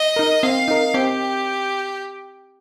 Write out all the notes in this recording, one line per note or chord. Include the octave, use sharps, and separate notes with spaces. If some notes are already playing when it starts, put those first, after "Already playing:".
Already playing: D#5
D#4 A#4
C4 F5
D#4 A#4
C4 G4